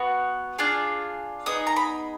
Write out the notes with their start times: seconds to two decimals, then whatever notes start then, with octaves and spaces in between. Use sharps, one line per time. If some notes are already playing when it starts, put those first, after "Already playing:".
Already playing: B3 F#4
0.58 D4 F4 G#4
1.46 B3 D#4 G#4 D#6
1.67 A#5
1.76 B5